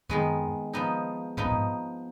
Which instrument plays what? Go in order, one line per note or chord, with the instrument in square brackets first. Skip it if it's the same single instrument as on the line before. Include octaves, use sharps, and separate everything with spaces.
[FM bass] F#2 [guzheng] D#3 G#3 B3
[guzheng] F3 B3 D#4
[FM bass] G#2 [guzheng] F3 B3 D#4
[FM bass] F#2
G#2